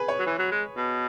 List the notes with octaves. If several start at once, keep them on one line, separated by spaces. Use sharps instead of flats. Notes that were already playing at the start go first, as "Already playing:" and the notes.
Already playing: G#4 B4
C#5
F#3
E3
F#3
G#3
B2